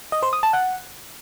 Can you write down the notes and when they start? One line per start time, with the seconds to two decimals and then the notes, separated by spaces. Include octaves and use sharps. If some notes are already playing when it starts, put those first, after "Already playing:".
0.12 D#5
0.23 C5
0.33 D#6
0.43 A5
0.53 F#5